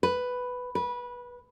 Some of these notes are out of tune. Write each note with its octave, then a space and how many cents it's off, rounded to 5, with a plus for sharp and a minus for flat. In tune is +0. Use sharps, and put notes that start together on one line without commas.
B4 +5
B4 -20